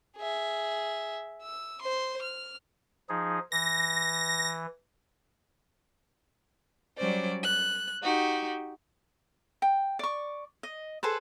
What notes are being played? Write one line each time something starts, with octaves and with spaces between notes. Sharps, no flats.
G#4 E5
E6
C5 C6
F6
F3 D#4 G#4
E3 A#6
F#3 G3 C#4 C5 D5
F#6
D#4 F#4 G4
G5
D5 C#6
D#5
G#4 A4 B4 C5